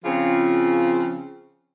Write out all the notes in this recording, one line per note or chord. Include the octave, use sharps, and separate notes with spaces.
C#3 F3 C4 F4